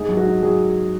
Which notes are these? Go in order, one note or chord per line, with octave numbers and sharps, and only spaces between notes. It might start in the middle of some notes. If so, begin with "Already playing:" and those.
Already playing: G#2 G#4
F#3
F#4
G#2
F#3 G#4